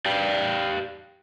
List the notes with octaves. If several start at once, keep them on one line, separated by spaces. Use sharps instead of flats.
G4 D5 F5 G5